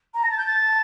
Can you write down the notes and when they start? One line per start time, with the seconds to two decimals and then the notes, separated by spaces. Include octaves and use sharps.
0.14 A#5
0.23 A5 A#6
0.31 A6
0.38 G6
0.46 A6